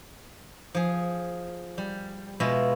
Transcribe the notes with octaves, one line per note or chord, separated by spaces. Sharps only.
F3 G#4
G3
B2 G#3 F4 E5